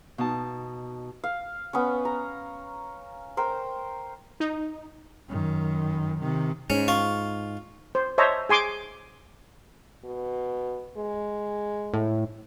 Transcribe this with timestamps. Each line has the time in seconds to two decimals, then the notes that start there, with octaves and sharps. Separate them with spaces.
0.18 B2 D#4 A5
1.24 F5
1.73 B3 C#4
2.05 A#5
3.37 A#4 C5 G5
4.40 D#4
5.29 F#2 D#3
6.20 C3 D#3
6.70 G#2 C#4
6.88 F4 C#6
7.95 C5
8.18 C5 C#5 D#5 E5 A5 A#5
8.49 G#4 G#5 C6 D6
10.05 B2
10.97 G#3
11.94 A2